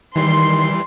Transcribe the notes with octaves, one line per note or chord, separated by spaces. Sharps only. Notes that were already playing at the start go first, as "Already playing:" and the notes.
D#3 E3 G3 C6